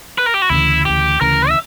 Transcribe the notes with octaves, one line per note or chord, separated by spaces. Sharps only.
B4
A#4
G4
F#4
D2 C#3 E3 E4
D2 C#3 E3 G4
D2 C#3 E3 A#4
E5